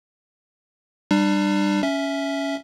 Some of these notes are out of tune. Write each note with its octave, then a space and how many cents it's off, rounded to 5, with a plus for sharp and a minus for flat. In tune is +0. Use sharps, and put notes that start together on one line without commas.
G3 +0 D4 +35
C#4 +10 E5 +0